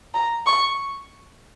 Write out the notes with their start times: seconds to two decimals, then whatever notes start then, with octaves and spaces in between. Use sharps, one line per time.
0.14 A#5
0.46 C#6